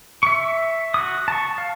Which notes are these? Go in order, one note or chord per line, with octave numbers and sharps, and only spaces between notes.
E5 C#6
F#4 D#6
A5 C#6
F5